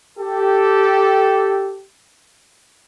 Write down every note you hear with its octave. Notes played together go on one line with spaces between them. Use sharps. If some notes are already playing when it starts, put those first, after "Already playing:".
G4 A4